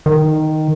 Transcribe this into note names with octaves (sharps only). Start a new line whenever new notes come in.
D#3